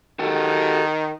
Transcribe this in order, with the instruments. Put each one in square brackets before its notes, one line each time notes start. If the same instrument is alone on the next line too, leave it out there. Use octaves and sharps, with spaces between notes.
[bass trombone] D#3 [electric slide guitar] F#4 G4 A4